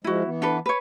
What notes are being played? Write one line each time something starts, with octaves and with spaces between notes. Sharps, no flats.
F3 G#3 E4 F#4
E3 B3
D4 A4 B4
B4 C#5